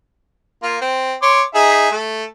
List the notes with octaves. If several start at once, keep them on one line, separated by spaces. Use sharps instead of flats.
A#3 F4
C4
C#5 C6 D6
D#4 G#4 E5
A3